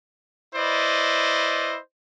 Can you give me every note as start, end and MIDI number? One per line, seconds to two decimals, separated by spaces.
0.55 1.78 64
0.55 1.78 71
0.55 1.78 72
0.55 1.78 74
0.55 1.78 75